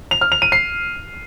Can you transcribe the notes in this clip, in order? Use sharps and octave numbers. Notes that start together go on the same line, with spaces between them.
F7
F6
F7
D#7
C7